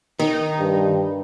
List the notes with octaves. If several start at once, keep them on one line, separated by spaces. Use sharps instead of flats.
D#3 D#4
G2